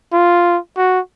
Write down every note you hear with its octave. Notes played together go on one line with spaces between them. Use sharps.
F4
F#4